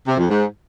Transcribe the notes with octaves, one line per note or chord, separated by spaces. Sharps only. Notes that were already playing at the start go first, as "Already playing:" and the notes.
C3
F2
G#2